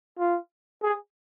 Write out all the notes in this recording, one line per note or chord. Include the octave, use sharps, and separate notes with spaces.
F4
G#4